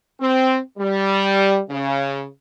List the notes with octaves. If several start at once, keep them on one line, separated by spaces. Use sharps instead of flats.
C4
G3
C#3